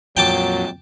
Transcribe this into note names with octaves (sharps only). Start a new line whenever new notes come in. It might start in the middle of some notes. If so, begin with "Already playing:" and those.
F2 A#2 F#3 G5 A5 D6